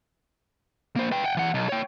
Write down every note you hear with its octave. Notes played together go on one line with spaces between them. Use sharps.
A#3 C5
B4 G5
F#5 G5
E3 F#5
B1
C#5 G5